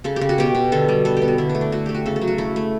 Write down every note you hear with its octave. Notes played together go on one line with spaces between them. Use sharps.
C#3 A4
G4
C#3
F#4
B2 G4
B2
D3 A4
G3
B3 A4
G4
B3
F#4
D3 E4
D4
A3
D4
A3 F#4
A3 G4
F#4
C#3 A4
A4
F#3
F#4
A3 E4
A3